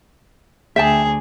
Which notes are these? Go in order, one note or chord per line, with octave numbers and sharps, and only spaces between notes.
D2 G#4 E5 G5 A5